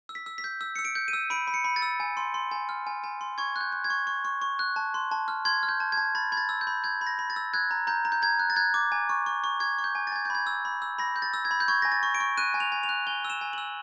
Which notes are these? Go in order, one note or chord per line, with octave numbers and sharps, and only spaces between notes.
E6
B6
E6
B6
G6
E6
E6 C#7
D7
G6
D#7
E6
B5 D7
B5
C#7
B5
A6
E6
G#5
C6
C6
G#5
F6
G#5
G#5
C6
C#6 G#6
F#6
G6
F#6
G#6
C#6
C#6
C#6
C#6
F#6
A5
C6
A5
F6
C6 G#6
F6
G6
A5
G#6
A5
B5 A6
B5 G#6
A6
E6
G6
B5
G6 G#6
B5
A#6
B5
A6
E6
F#6 G#6
A#5
A#5 G6
A#5
G6
A#5 G#6
F#6
A6
F#6 G#6
D6
G#5
C#6
C#6
C#6
C#6 G#6
C#6
G6
G#5
A6
G#5 G#6
G6
B5 G#6
E6
B5
E6
B5 A#6
G6
A6
E6
G#6
B5
G6
C#6 G#6
G#5 A#6
A6
C#6
D7
C#6
F#6 D#7
G#5
F7
G#5
F7
F#6
G#5 G7
E6
E7
G#5
E6 F#7